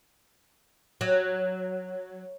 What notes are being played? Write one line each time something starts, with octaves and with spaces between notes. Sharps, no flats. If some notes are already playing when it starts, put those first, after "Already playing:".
F#3